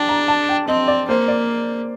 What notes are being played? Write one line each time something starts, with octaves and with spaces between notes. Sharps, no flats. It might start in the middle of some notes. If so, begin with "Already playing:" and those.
Already playing: D4 G5 A5
A#5
A5
G5
C4 D#5
D5
A#3 C5
D5